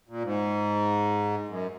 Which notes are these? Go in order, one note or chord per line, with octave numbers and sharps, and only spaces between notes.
A#2
G#2
F#2